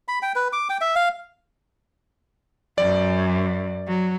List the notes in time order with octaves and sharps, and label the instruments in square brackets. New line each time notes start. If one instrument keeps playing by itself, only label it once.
[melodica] B5
G5
B4
D6
G5
E5
F5
[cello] F#2 [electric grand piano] D5
[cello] F#3